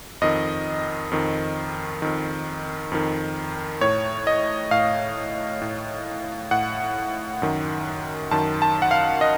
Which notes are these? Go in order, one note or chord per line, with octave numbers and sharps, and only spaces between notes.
F2 D#3 D#5
F2 D#3
F2 D#3
F2 D#3
A2 C#5
D#5
A2 F5
A2
A2 F#5
F#2 D#3
F#2 D#3 A5
A5
F#5
F5
D#5